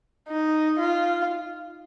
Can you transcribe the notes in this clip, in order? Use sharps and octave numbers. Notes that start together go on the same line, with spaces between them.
D#4
F4